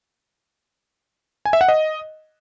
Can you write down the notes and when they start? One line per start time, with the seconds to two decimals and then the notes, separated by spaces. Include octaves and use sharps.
1.45 G#5
1.53 E5
1.61 F#5
1.68 D#5